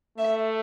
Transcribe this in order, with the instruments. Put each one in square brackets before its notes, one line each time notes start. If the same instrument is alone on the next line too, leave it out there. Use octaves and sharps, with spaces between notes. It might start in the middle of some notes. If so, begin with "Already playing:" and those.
[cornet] A3 [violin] E5